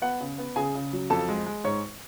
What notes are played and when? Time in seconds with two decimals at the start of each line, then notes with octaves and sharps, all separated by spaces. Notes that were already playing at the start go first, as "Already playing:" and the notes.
0.02 B3 F#5
0.20 C#3
0.38 B3
0.56 C#3 G#4 G#5
0.75 C#3
0.93 F#3
1.10 F2 A4 A5
1.28 G#3
1.46 G#3
1.64 G#2 C#5 C#6